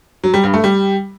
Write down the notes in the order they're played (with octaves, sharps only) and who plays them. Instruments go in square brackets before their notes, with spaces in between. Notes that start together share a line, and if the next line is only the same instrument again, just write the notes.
[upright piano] F#3
G3
G2
A3
G3